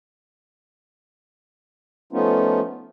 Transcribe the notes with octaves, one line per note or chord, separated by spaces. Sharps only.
F3 A3 B3 C#4 D#4 F4